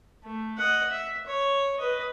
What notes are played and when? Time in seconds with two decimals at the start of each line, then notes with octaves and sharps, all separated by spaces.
0.24 A3
0.58 D#5 F#5
0.91 E5
1.26 C#5
1.78 B4 D#5